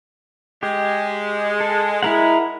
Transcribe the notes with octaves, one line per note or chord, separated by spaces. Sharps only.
G#3 G4
A4
G#3 E4 A#4 F#5